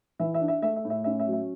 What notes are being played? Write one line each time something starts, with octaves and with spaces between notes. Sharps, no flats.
E3 E5
E5
D4
E5
A3 E5
E5
A2
E5
C#4 E5
E5
F#3
E5